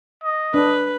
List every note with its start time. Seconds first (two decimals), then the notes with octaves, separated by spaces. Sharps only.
0.24 D#5
0.54 D4 B4